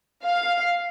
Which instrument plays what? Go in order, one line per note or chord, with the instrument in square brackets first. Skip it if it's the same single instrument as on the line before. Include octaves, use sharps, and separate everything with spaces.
[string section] F5